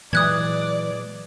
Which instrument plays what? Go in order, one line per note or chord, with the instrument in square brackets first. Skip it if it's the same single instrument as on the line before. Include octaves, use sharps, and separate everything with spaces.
[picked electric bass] A#2 F#3 G#3 [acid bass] E3 [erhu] D5 [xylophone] D#6 F#6 G#6